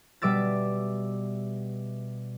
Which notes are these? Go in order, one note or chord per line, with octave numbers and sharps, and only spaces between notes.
B2 G3 E5 D6 E6 A6